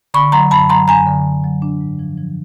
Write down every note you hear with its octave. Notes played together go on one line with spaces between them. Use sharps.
D3 B5 C#6
F#3 A#5 C6
F#2 A5 B5
F#3 A#5 C6
F#2 G#5 A#5
D3
F#2
F#3
D4
G#2
F3
F3